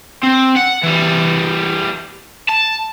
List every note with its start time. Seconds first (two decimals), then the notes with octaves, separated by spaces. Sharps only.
0.24 C4
0.57 F#5
0.83 E3 G3
2.49 A5